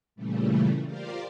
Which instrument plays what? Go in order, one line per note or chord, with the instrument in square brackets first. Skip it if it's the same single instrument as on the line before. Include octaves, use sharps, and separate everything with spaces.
[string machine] A#2 C#3 E3 G3 A3
F4 G4 A#4 C5 D5 F5